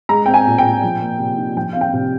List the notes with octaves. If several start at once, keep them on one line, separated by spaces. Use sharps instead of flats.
G#3 A#5
C4 G5
G#5
A#2
G5
A#2
F3
A#3
C3
D#4
F3 G5
C4 F5
G5
C3